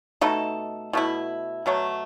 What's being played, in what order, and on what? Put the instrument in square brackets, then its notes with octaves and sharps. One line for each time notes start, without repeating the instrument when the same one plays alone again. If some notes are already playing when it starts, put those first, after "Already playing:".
[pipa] B2 A3 D#4 A4
B2 A3 E4
B2 F#3 A3